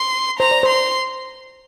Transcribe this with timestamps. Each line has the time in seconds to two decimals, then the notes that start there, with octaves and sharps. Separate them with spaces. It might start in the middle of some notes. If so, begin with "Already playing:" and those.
Already playing: C6
0.39 C5 A#5
0.51 D5
0.63 C5
0.69 C6